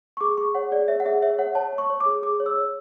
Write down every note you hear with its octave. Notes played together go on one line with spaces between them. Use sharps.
C#6
G#4 D6
G#4 C#6
C#5 F#5
G#4 D5
C#5 E5
F#5
G#4 E5
C#5 E5
C#5 F#5
C#5 A5
C#5
C#6
C#5
D6
G#4
G#4 D6
C#5
E6
C#5